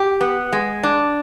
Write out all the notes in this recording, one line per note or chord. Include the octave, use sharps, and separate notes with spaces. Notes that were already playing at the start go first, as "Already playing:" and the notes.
Already playing: G4
B3
G#3
D4